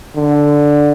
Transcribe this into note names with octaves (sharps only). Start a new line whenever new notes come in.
D3